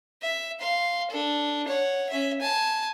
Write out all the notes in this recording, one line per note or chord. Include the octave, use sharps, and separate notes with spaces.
E5
F5 C6
D4 A4
C#5 F#5
C#4 E5
G#5 A5